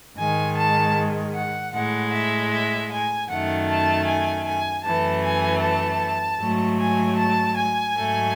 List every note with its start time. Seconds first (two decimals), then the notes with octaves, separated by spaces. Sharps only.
0.17 G#2 D#3 G#3 G#5
0.57 A5
1.34 F#5
1.74 A2 G#3 F#5
2.13 E5
2.51 E5
2.90 G#5
3.29 F#2 D#3 A3 F#5
3.69 A5
4.07 G#5
4.45 G#5
4.84 F#2 E3 A3 A5
5.23 G#5
5.62 A5
6.40 G#2 F#3 A3
6.80 G#5
7.18 A5
7.57 G#5
7.96 G#2 F#3 A3